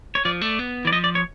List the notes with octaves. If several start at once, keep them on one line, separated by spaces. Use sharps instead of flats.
C#5
F3 D5
A3 D5
B3
E3
D5
F3 D#5
D5
C#5